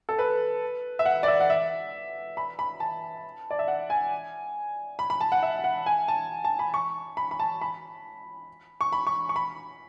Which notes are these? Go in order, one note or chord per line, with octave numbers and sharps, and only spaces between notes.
A4
B4
E5
F#5
D5
E5
F#5
E5
B5
B5
A5
D5
E5
F#5
G#5
B5
B5
A5
F#5
E5
F#5
G#5
A5
A5
B5
C#6
B5
B5
A5
B5
C#6
B5
C#6
C#6
B5